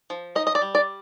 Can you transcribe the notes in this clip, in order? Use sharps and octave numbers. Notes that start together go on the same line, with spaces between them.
F3
D#4 D#5
D#5
D5
G3
D5